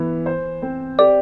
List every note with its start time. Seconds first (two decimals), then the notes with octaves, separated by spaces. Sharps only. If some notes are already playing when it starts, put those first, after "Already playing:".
Already playing: E3 B3
0.26 C5
0.62 C4
0.99 G4 D5